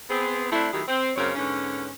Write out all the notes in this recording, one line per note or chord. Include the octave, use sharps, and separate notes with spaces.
B3 C4 G#4
A3 C4 D4 E4
D#3 F#3 A3 E4 G4 G#4
C4
F#2 C#3 A#3 C4 A#4 C#5
G#2 D3 B3 C#4